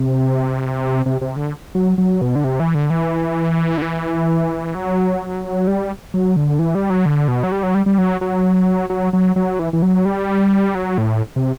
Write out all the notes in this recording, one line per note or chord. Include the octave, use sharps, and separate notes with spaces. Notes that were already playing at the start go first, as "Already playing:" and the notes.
Already playing: C3
C3
C3
D3
F#3
F#3
B2
D3
C3
E3
D3
E3
D3
E3
F#3
G3
F#3
D3
E3
G3
F#3
D3
B2
F#3
G3
F#3
G3
G3
F#3
F#3
F#3
F#3
F#3
E3
E3
F#3
G3
F#3
A2
C3